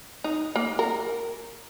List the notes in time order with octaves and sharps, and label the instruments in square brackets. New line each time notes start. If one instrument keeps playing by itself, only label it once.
[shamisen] D#4
A#3
A#4